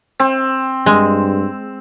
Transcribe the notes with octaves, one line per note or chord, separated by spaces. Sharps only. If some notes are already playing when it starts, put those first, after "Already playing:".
C4
G2 G#3